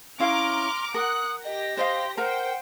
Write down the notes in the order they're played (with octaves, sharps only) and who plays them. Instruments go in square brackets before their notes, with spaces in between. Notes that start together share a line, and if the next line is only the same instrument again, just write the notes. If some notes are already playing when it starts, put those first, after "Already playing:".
[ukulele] C#4 E4 F5 [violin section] A#5 D6 F6 [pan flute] C6
[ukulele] A#4 [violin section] F#5 F#6 [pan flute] D#6
[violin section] G4 A#6 [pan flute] D#5
[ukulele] C5 D#5 F5 [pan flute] C6
[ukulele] A#4 A#5 [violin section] C5 G5 [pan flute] F#5